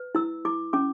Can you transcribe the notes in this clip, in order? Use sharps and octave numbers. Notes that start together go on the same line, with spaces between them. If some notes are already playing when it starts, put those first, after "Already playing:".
Already playing: B4
E4 E6
E4 D6
C#4 D6